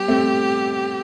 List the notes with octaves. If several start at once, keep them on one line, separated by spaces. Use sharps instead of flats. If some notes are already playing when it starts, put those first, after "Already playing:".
Already playing: G3 B3 G4
A3 C4